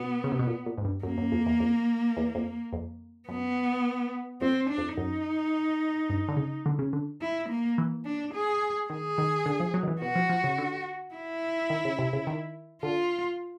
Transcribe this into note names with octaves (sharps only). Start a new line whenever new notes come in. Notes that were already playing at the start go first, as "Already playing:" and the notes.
Already playing: B2 B3
C#3
C3
B2
A#2
A#2
G#2
G2
F#2 A#3
F#2
F2
E2
F2
E2
F2
F2
F#2 B3
F2 C4
D4
F2
F#2 D#4
G2
D3
C#3
D3
C#3
D3
E4
A#3
E3
D4
G#4
D#3 G#4
D#3
D3
F3
F#3
D#3
E3
B2 F#4
F3
F3
C#3
D3
E4
D#3
C#3
C3
C#3
D#3
D3 F4